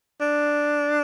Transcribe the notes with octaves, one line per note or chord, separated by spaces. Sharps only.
D4